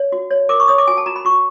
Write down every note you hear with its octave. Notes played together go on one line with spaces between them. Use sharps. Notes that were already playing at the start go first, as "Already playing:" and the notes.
Already playing: C#5
F#4
C#5
A#4 D6
C#6
C#5 D#6
D6
F#4 G#5
A5
F#4 A#5
B5
F#4 C#6